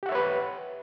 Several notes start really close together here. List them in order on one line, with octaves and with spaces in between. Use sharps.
G4 F#5 E5 C#5 B4